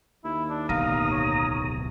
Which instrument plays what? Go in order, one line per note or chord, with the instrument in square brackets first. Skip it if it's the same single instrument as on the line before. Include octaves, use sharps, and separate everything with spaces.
[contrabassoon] D#2 [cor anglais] E4
[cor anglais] D4
[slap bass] D1 B1 [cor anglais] F5 [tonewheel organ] A#5 D#6
[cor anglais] C#5